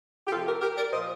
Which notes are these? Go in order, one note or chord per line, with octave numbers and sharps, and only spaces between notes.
G4
C3 F3 F4 A4
G4 A#4
G4 A#4
A#4 D5
A#2 F3 C5 D#5